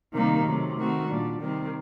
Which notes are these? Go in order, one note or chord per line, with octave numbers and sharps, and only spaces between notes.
C3 D#3 G3 A#3 D#4
C3 F#3 A3
D#3 A3 C4 F#4
A#2 G3 D4
C3 D#3 G3 C4